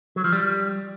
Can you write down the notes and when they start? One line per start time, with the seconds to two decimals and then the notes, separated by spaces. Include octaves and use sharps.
0.16 F#3
0.24 F3
0.32 G3